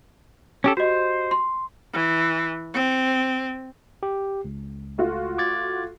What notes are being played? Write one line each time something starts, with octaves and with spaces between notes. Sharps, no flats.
C#4 G4 A4
F#4 G4 C5 D#5
C6
E3
C4
G4
C#2
A3 F4 F#4
D6 G#6 A6